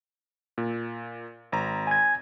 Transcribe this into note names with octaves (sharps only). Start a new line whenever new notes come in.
A#2
G#1 A#5
G#5 G#6